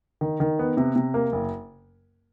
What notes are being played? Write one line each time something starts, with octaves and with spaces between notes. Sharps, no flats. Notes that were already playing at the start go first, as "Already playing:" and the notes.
D#3
D#3
B3
C3
C3
A#3
F#1